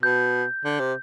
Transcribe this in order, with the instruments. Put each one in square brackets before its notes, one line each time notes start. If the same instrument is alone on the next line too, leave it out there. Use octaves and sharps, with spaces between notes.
[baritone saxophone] B2 [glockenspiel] G6
[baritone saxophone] D3
C3